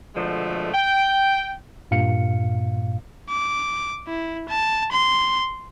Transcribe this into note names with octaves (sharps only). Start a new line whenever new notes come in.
B2 D3 F3 G#3 A3
G5
G2 A#2 F5 C#7
D6
E4
A5
C6